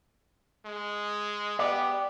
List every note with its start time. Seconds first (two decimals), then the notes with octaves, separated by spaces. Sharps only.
0.65 G#3
1.59 B3 G4 D5